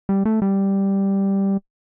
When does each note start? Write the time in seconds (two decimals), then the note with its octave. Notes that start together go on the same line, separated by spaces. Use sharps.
0.09 G3
0.25 A3
0.42 G3